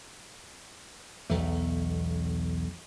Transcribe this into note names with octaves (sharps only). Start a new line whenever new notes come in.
B1 E2 A3